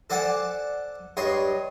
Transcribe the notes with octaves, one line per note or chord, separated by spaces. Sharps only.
A4 C5 D5 F#5 G#5 A5
G2 C#5 D#5 C6